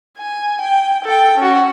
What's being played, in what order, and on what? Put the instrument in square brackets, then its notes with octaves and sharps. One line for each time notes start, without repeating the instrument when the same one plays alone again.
[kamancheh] G#5
G5
A4 G5
C#4 F#4